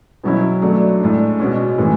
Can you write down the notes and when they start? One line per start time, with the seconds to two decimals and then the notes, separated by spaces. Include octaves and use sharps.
0.24 B2 F#3 C#4 E4
0.62 F#3 A3 D4
1.00 A2 G#3 D4
1.39 B2 G#3 C#4
1.78 A2 E3 G#3